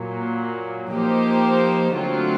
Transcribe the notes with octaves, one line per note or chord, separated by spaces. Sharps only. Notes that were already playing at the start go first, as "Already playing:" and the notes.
Already playing: A#2 F#3 A#3
F3 A#3 D#4 G4 C5
D3 F#3 A3 C4 F4